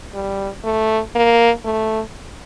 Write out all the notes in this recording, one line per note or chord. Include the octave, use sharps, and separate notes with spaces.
G3
A3
A#3
A3